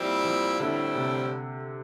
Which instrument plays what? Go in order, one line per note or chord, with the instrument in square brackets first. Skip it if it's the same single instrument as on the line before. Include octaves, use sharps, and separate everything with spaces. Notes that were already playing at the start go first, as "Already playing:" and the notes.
Already playing: [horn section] A#2 G3 C4 E4 [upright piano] F3
[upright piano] F3
[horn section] A2 G3 C4 E4 [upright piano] D3
[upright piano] C3